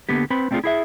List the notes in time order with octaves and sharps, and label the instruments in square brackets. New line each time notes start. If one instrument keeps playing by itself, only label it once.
[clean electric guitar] D3 A#3 B3 G4
C4 B4 B5
A3 C4 D4 D#4 F4 G#4
E4 G#4 E5